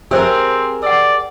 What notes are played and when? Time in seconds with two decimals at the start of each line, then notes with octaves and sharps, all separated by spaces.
0.11 C4 G4 G#4 A#4 C5 E5 E6
0.83 D5 F#5 E6